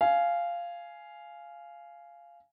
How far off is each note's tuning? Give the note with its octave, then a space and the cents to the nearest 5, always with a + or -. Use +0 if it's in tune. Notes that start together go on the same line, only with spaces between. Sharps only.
F5 -10 G#5 +10